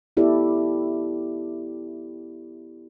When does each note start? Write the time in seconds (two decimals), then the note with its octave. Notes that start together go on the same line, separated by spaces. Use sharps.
0.17 B3 E4 G4 A4 D5